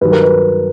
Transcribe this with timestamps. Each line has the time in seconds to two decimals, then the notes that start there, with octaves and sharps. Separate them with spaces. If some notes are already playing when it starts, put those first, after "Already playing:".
0.01 G2 D#3 F#3 B4
0.12 A#4
0.23 B4